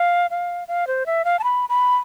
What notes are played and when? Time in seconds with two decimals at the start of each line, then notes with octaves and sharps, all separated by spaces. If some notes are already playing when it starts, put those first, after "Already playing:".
Already playing: F5
0.31 F5
0.68 F5
0.87 C5
1.06 E5
1.25 F5
1.39 A5
1.44 B5
1.69 B5